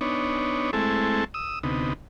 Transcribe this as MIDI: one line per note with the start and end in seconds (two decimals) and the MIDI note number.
0.01 0.71 59
0.01 0.71 62
0.01 0.71 63
0.01 0.71 73
0.73 1.24 56
0.73 1.24 57
0.73 1.24 60
0.73 1.24 64
0.73 1.24 69
1.34 1.59 87
1.34 1.59 88
1.63 1.93 38
1.63 1.93 48
1.63 1.93 59
1.63 1.93 63